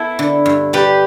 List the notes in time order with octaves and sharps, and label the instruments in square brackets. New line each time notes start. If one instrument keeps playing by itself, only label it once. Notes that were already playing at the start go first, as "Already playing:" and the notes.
Already playing: [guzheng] B3 [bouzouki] E4 A4
[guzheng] D3
G2
[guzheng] G3 [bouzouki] G4 B4